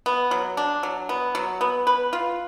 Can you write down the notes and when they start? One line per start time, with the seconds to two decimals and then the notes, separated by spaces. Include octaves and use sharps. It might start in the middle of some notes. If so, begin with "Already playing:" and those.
0.06 B3
0.31 F#3
0.57 D4
0.83 F#3
1.09 B3
1.35 F#3
1.61 B3
1.87 B4
2.13 F4